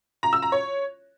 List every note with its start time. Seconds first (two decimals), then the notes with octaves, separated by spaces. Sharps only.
0.23 A#5
0.33 E6
0.42 A#5
0.52 C#5